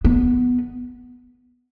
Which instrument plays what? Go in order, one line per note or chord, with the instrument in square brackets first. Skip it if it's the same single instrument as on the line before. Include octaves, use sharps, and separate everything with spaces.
[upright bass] B3